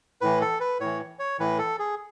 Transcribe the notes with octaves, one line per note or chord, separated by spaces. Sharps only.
A2 E3 B4
A4
B4
A2 E3 C#5
C#5
A2 E3 B4
A4
G#4